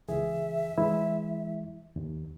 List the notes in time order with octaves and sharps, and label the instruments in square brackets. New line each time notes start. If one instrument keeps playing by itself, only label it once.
[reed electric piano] C#2 E3 G#4 [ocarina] E5
[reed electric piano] E3 G#3 E4
D#2